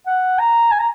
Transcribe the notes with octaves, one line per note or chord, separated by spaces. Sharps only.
F#5
A#5
G#5
A#5